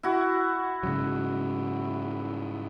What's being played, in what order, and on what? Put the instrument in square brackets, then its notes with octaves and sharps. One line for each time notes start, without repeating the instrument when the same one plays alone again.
[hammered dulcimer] E4 F#4
[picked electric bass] G#2 C#3 F#3